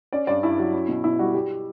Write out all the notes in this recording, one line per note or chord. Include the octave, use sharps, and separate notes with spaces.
C#4 D5
G2 D5
G2 E4
F#3
C#4
B2
B2 E4
G3 F#4
G3 G4